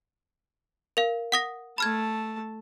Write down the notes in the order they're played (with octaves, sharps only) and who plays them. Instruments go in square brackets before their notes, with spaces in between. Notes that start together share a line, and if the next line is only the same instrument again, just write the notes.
[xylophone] A#4 F5
F#5 D#6 A#6
[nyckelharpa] A3 A5 [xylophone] B5 F6 G#6